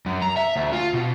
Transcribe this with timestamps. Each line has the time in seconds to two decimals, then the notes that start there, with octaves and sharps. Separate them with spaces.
0.06 F#2
0.22 A#5
0.36 E5
0.56 D2
0.72 F4
0.94 B2